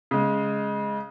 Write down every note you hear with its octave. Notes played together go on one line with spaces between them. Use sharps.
C#3 G#3